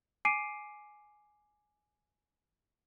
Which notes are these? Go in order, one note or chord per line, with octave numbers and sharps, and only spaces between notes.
G#5 D6 C7 D7 D#7